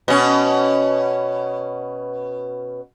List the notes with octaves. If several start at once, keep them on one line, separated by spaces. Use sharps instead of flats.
B2 C#4